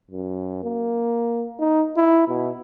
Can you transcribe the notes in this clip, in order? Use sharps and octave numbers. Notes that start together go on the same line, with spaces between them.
F#2
A#3
D#4
E4
B2